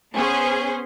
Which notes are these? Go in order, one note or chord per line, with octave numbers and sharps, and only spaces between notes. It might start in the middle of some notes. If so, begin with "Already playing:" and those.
B3 C#4 G#4 C5